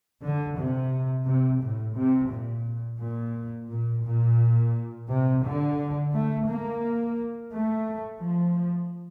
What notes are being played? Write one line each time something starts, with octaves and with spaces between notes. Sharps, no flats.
D3
C3
C3
A2
C3
A#2
A#2
A#2
A#2
C3
D3
A3
A#3
A3
F3